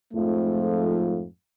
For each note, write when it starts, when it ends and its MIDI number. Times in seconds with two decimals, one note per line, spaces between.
0.14 1.24 41
0.14 1.24 44
0.14 1.24 53
0.14 1.24 57